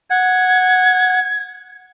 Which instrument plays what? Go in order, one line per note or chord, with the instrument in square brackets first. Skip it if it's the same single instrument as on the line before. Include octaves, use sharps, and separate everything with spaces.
[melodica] F#5 [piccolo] G#6